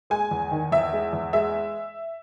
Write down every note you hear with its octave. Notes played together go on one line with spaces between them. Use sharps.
G#3 G#5
E2
D#3
E2 E5
G#3
E2
G#3 E5